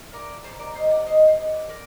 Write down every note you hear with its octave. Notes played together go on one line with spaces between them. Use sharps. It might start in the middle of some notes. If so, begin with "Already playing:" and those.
Already playing: A2 A3
A#4 D5
C3 D#3 G3 A4 C5
A#4 D5
C5 D#5
D5 F#5
C5 D#5
C5 D#5
D5 F#5
D3 A#4 D5